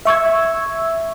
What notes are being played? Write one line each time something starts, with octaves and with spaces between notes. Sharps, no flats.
E5 C#6 E6 G#6